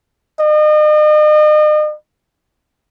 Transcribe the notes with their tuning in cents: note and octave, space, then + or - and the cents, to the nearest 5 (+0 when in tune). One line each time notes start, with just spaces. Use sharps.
D#5 -40